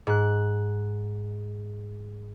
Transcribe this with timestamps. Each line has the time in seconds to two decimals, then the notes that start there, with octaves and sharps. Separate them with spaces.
0.07 G#2 F#6